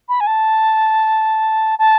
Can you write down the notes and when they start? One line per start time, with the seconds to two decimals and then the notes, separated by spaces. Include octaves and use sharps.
0.08 B5
0.20 G#5
0.27 A5
1.79 A5